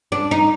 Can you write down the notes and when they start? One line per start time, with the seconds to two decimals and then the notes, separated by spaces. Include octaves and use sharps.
0.12 D4
0.31 D#4